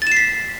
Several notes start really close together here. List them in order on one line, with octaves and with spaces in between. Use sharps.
A6 E7 C7 B6